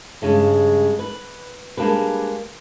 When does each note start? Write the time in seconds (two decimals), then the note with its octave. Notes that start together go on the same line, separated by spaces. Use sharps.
0.22 G2 C#3 G#3
0.99 B4
1.77 G3 G#3 A#3 D4 G4 B4